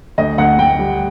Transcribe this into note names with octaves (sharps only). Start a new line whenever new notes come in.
D2 D#5
D2 F#5
D2 G5
G3